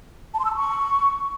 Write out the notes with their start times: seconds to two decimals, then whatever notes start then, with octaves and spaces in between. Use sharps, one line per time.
0.34 A5
0.39 C6
0.45 E6
0.50 A5
0.56 C#6